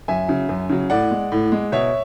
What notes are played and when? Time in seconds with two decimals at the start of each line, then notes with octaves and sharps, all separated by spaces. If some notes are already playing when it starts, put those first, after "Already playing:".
0.08 F#2 E5 G#5
0.28 C#3 F#3
0.49 F#2
0.69 C#3 F#3
0.90 A2 D5 F#5
1.11 G#3
1.32 A2
1.52 G#3
1.72 B2 C#5 E5